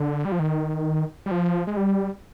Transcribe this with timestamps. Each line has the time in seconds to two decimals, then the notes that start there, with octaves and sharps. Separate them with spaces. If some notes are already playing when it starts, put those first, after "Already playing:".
Already playing: D3
0.25 G3
0.32 F3
0.39 D#3
1.26 G3
1.31 F3
1.67 G#3
1.77 G3